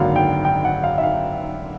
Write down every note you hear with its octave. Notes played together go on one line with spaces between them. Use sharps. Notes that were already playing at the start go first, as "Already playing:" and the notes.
Already playing: G#1 F#2 D3 F#3 A#3 F5
G5
G5
F#5
F5
E5
F5